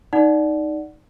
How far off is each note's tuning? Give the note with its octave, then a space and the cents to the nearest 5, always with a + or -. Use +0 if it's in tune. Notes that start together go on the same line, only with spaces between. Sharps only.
D#4 +0 D5 +0 F#5 +0